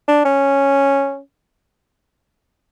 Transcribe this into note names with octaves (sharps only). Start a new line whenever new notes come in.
D4
C#4